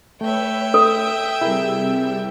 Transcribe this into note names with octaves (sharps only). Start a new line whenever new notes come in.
A3 B4 C#5 E5 G5
A4 D#6
C3 G3 E4 G#4 A#4